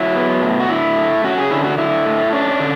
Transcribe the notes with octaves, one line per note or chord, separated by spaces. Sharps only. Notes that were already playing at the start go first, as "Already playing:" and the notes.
Already playing: F#3 E4
B3
A2
F#4
D3 E4
A3
C#4 F#4
G#4
D3 E4
F#4
D3 E4
A3
C#4 D4
D3